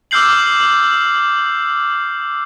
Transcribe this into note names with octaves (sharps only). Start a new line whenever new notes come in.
D6 E6 F6 G6 C7 F#7